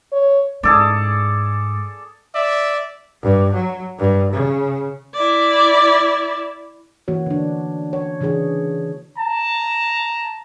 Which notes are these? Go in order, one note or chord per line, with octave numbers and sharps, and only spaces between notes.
C#5
G#2 G#4 A4 D5
D5 E5
G2
F#3
G2
C#3
E4 D5
E3 A#3 F#4 C#5
D3 D4
C#5
C#3 E3 D4 G#4 C#5
A5 A#5